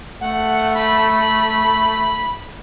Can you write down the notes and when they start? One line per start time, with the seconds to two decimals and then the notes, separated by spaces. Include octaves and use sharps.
0.21 A3 F#5
0.75 B5